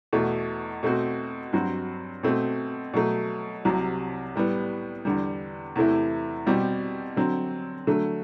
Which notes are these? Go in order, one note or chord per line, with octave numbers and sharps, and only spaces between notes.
E2 B2 A3
B2 A3 C4 F#4
G2 F#3 C4 F#4
B2 A3 C4
B2 F#3 A3
C2 C3 F#3
A2 G3 B3
E2 D3 G3
E2 C3 E3 A3 E4
B2 G3 C4 G4
D3 F#3 C4
D3 F#3 A3